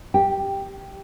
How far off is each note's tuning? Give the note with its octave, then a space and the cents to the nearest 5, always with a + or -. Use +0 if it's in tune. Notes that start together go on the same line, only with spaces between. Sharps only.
G4 +0 G5 +0